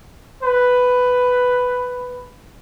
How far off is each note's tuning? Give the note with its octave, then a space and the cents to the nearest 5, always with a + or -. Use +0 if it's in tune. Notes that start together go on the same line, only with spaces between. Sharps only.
B4 +10